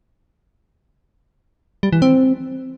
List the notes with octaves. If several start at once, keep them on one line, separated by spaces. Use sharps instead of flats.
G3
E3
C4